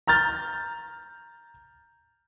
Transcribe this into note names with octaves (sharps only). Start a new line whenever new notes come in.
A#5 F6 G6 A6